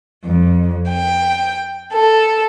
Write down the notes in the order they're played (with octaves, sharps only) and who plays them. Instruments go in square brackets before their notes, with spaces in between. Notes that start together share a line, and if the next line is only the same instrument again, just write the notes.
[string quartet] F2
G5
A4